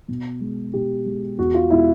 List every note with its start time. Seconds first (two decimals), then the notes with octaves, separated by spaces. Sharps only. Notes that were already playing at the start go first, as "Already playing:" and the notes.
0.08 B2
0.41 G#3
0.73 B2 G4
1.06 G#3
1.38 E2 F#4
1.54 F4
1.70 B2 G#3 E4